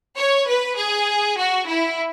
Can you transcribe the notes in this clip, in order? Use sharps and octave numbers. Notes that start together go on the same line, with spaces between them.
C#5
B4
G#4
F#4
E4